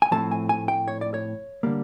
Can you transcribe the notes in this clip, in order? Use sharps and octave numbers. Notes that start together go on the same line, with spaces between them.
G#5
A2 F3 A3 C4 A5
G#5
G#5
G5
C#5
D5
C#5
D3 G3 A#3